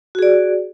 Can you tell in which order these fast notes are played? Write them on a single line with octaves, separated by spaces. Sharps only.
F#4 G#4 D5